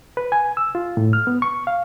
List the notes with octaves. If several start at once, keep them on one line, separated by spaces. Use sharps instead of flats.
B4
G#5
E6
F4
A2
F6
B3
C#6
F5